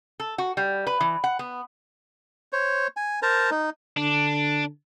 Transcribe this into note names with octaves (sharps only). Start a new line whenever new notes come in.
A4
F#4
G3
B4
E3
F#5
B3
C5 C#5
G#5
A#4 C5 A5 A#5
D#4
D3 D4